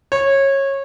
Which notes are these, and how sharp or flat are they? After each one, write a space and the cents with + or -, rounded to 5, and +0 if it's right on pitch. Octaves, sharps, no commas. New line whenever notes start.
C#5 -20